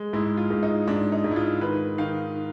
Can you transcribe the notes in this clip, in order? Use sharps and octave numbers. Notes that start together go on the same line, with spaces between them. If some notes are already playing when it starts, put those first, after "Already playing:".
Already playing: G#3
G#2 E4
F4
G#2
D#4
G#2 D4
D#4
G#2
E4
F4
D#3 B4
D#3 F5